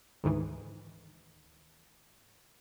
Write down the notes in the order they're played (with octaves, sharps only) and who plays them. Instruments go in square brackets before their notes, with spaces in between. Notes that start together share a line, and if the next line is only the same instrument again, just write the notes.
[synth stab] D2 G#2 D#3 E3